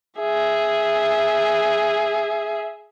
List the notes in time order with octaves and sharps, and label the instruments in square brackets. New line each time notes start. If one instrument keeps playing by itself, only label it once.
[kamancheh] G#4 E5